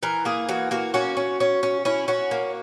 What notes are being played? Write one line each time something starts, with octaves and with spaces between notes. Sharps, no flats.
E3 A#4
A#3 G#4
E3 F#4
A#3 F#4
C#4 F#4
C#4
C#4
C#4
C#4 E4
C#4 F#4
A#3